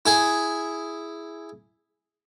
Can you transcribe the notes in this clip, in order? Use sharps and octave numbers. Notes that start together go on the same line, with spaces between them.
E4 G#4 G#5